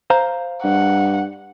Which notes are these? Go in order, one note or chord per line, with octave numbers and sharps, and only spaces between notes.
C5 F5 A#5
G2 F#5